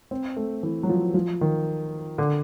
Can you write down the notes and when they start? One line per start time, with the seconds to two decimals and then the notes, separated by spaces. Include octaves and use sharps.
0.11 C4
0.37 A3
0.63 E3
0.83 F#3
0.89 F3
1.14 F3
1.41 D#3
2.18 D3